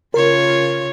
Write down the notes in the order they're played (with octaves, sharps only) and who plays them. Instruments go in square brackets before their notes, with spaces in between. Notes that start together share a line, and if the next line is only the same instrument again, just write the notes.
[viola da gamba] C#3 F4 C#5 [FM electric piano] A#4